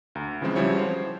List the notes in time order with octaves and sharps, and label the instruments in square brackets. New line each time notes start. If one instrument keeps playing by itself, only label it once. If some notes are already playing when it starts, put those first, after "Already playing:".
[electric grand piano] D2 A#5
C#3 E3 F3 G#3 C4
C#3 F3 G3 E4 F#4 C#5
C5 C#5